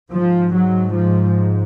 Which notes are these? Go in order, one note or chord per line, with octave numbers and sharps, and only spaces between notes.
G#2 F3
F#3
F3